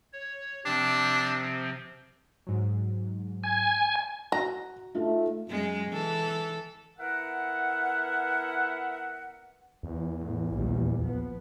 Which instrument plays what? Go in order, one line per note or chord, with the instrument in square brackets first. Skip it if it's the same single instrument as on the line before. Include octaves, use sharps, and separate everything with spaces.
[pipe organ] C#5
[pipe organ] C3 F3 C4 [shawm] D4
[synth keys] G#2 F#3
[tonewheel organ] G#5
[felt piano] F#4 [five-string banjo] A#5
[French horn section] A3 [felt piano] D#4 F4
[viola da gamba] F#2 G#3
E3 A4
[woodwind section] B3 E4 A#4 E5 F#5
[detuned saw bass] E2
[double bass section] A2
A#1 D#2 G3
F3 B3